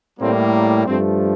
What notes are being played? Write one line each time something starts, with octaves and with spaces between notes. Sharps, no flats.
A2 G3 A#3 C4
G2 F3 A3 C4